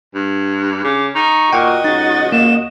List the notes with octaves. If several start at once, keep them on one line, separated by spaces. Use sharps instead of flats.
G2
C#3 D6
D#4 C#6
A#2 F#4 D#5 F#5 G5
C#2 D#4 A6
A#3 E7